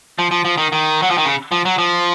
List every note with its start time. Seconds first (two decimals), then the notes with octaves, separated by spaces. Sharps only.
0.19 F3
0.31 F3
0.45 F3
0.58 D#3
0.72 D#3
1.02 F#3
1.10 F3
1.18 D#3
1.26 C#3
1.52 F3
1.65 F#3
1.78 F3